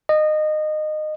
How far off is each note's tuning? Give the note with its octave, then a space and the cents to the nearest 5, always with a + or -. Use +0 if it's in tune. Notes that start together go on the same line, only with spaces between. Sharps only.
D#5 -20